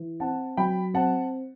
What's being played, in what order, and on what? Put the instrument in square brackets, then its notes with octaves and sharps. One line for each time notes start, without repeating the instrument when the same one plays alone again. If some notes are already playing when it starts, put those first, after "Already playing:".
Already playing: [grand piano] E3
C4 F#5 A5
F#3 G5 B5
C4 F#5 A5